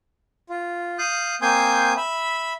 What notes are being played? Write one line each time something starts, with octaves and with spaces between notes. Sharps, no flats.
F4
F5 D#6 F#6 G6
A#3 C4 G#5 C6 D#6 G6
E5 B5